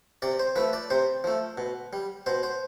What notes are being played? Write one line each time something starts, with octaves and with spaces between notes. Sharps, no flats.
C3 D5
C5
F3 A3 B4
D5
C3 C5
F3 A3
B2
G3
B2 C5
C5